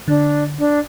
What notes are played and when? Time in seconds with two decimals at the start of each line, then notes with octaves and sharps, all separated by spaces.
0.08 D3 D4
0.58 D4